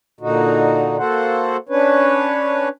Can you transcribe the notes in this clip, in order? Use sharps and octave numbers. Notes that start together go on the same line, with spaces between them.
A#2 D3 D#4 F#4
A#3 F#4 A4 C5 F#5
C#4 D4 B4 C#5